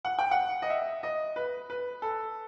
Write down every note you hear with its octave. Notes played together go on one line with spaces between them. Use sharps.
F#5
G5
F#5
D#5
E5
D#5
B4
B4
A4